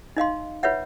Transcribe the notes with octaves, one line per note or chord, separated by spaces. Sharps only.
D#4 D#5 F5 C6
F4 B4 C#5 E5 F#5